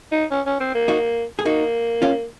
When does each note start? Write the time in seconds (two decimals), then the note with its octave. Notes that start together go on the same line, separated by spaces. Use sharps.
0.12 D#4
0.31 C#4
0.46 C#4
0.60 C4
0.74 A#3
0.88 D#4 F#4
1.39 G#4
1.45 A#3 D#4 F#4
2.02 C#4 F4